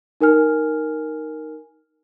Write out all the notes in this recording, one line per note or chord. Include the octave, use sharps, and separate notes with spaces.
D#4 A#4 G#5 F6